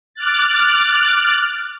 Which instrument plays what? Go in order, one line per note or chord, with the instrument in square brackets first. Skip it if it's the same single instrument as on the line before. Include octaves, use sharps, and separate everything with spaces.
[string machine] D6 F6 F#6 A6